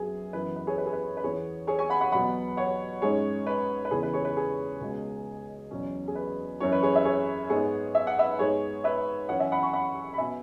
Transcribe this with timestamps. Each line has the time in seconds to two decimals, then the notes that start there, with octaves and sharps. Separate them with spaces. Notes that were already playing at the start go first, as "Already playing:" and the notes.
Already playing: F#2 F#3 B3 G#4
0.33 F#2 E3 B3 B4
0.56 B4
0.67 G#4 C#5
0.78 B4
0.86 G#4
0.93 B4
1.17 B4
1.23 E2 E3 B3 G#4 C#5
1.67 G#4 C#5
1.79 G#5 C#6
1.90 F#5 B5
2.01 F#5 B5
2.12 E2 B2 F#3 B3 F#5 B5
2.57 C#5 F#5
3.02 G#2 G#3 C#4 G#4 C#5
3.47 B4
3.85 B4
3.91 E2 C#3 E3 G#4
4.03 B4
4.13 G#4 C#5
4.25 B4
4.37 G#4
4.81 C#2 B2 G#3
5.71 E2 B2 F#3 C#4
6.08 G#4
6.15 B4
6.60 F#2 E3 C#4 C#5
6.72 B4
6.83 G#4 C#5
6.95 E5
7.05 G#4 C#5
7.50 G#2 G#3 B3 G#4 C#5
7.95 E5
8.07 F#5
8.19 B4 E5
8.39 G#2 G#3 B3 G#4 C#5
8.84 B4 E5
9.29 F#2 E3 C#4 C#5 F#5
9.40 E5 G#5
9.52 F#5 B5
9.63 G#5 C#6
9.73 F#5 B5
10.13 B5
10.18 B2 B3 E5 G#5